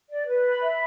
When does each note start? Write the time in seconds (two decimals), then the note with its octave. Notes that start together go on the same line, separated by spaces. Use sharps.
0.10 D5
0.28 B4
0.45 B5
0.62 E5